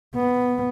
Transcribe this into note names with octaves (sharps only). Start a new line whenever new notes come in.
B3